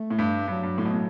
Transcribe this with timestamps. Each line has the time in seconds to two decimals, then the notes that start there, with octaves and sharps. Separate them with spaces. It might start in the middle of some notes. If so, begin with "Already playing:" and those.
Already playing: A3
0.10 A2
0.19 G2
0.48 G2 F#3
0.63 G2
0.78 A2
0.85 B2
0.93 A2